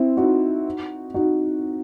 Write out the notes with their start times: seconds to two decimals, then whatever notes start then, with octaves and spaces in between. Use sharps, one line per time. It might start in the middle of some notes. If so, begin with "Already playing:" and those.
Already playing: C4 E4
0.17 D#4 F#4
1.14 D#4 F#4